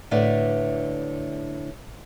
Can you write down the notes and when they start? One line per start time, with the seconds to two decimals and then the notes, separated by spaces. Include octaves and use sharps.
0.11 A2 D3 B4 D5 E5